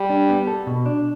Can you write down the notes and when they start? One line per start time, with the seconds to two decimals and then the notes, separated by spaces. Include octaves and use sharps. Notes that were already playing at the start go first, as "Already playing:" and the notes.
Already playing: G3
0.10 D4
0.29 B3
0.47 A4
0.67 B2
0.86 D4